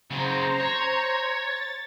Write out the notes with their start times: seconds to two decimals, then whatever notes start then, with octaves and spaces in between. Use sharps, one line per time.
0.11 C#3 F#3 C5 A#5
0.60 C#5
1.39 A6